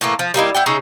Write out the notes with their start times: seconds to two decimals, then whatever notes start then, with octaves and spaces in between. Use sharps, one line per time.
0.01 A2 E3 A3 A#3
0.19 F3
0.34 G3 A#3 D#4 E4
0.55 E4 F#5 G5
0.66 C#3 D#4 G#4 E5